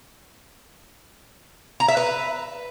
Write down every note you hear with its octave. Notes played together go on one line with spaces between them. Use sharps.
A#5
E5
B4